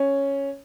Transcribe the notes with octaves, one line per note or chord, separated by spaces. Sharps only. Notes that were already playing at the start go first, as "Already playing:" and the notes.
Already playing: C#4